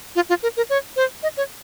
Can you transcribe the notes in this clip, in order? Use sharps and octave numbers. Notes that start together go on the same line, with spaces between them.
F4
F4
A#4
A#4
C#5
C5
D#5
C#5